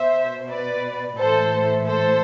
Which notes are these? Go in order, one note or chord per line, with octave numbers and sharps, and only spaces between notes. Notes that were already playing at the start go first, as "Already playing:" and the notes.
Already playing: B2 C5 E5
B4 D5
A2 E3 A4 C5
A4 C5